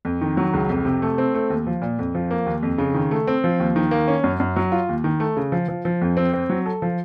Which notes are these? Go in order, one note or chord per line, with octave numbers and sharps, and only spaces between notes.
F2
D#3
F#3
C#2
F2
C3
A3
C4
A3
D#2
F3
A#2
F2
F3
A#3
D#2
F2
C#3
D#3
A3
C4
F3
D#2
D#3
A#3
C#4
F#2
F#2
F#3
F4
D#2
D#3
A3
C#3
F3
F3
F3
F2
C4
C4
F#3
A4
F3